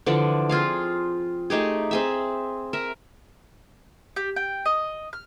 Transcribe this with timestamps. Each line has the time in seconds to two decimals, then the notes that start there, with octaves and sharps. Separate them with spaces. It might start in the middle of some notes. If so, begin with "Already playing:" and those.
0.06 D3 E3 F3 D5
0.49 C4 F4 G#4 F5
1.50 A3 D#4 G4 G#4
1.91 C4 G#4 E5
2.73 A#4 E5
4.16 G4
4.36 G5
4.66 D#5
5.13 F6